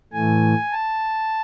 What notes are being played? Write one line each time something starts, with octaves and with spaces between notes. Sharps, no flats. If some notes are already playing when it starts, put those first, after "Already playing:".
A2 E3 A3 G#5
A5